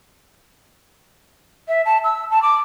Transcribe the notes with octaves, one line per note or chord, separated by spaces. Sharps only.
E5
A5
E6
A5
D6